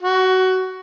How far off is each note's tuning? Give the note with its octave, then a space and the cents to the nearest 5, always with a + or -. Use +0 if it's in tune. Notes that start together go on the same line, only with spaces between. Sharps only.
F#4 +15